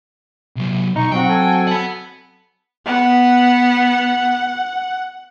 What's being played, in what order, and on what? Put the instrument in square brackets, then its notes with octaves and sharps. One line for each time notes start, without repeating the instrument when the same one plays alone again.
[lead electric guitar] C3 F#3
[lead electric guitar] B1 [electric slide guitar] D#4 [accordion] C#6
[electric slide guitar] F#3 C4 F#4 [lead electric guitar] G5
[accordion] A4 G#5
[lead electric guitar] F#5 B5
[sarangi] B3 [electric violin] F#5